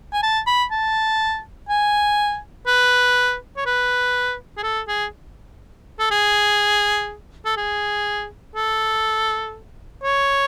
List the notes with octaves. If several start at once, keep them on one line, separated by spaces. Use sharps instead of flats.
G#5
A5
B5
A5
G#5
B4
C#5
B4
G#4
A4
G#4
A4
G#4
A4
G#4
A4
C#5